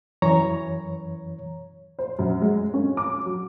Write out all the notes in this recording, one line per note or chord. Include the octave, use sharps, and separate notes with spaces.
F#2 E3 C#5 A#5
C5
F#2
G#3
C#4
D6
F#3